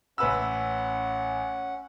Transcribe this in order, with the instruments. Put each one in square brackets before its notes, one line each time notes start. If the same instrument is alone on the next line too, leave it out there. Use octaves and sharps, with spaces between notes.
[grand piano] A1 B4 E6 [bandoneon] C#4 F#5